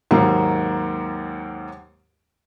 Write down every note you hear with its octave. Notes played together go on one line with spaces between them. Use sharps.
D#2 G#2 F#3 A#3